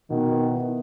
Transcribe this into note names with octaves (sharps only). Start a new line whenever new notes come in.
B2 D#3
B3
E4